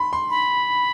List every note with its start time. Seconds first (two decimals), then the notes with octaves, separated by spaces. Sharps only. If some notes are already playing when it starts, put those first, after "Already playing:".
Already playing: B5 C6
0.13 C6
0.30 B5